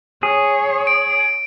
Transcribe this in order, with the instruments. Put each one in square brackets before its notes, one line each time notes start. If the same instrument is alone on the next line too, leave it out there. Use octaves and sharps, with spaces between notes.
[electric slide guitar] G#4 [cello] C#5
[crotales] D7